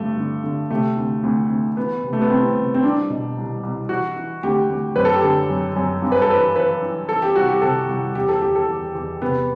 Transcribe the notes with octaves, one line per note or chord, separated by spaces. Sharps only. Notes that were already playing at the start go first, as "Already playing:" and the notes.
Already playing: G2 D3 A3
D3
D3
C3 A3
D2
D2
D2
E3 B3
C3
A3
B3
C2 C4
C3
C4
C2 D4
B2
C2
C2
E3 F#4
E3
D2 G4
D2
F#2 B4
A4
G4
D3 A4
F#2
F#2
G2
B4
A4
E3 B4
E3 B4
E3
E3 A4
G4
C2 F#4
G4
C3 A4
C2
E2 G4
A4
E2 G4
A4
E2
E2
C3 B3